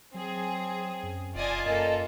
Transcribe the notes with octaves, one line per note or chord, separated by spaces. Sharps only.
F#3 C4 G#4
F#2
F1 F4 D5 D#5 G#5 A5
F#2 A#3 A4 D#5